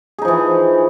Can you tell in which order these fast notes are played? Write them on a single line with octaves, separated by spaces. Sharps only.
G#4 D#4 F3 E3